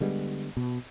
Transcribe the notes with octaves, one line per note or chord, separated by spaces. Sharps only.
D3 G3 G#3 B3
B2